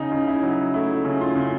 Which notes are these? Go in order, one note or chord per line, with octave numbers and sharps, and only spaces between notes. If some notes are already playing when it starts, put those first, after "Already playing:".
Already playing: C#3 D#4
C#3
E4
F#3
A3 E4
C#3
F4
C#3